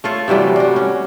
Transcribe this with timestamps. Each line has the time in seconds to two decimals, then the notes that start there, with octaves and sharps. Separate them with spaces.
0.04 A3 F4 C#5
0.28 C3 E3 F#3 G3
0.56 G3 F#4
0.76 C#4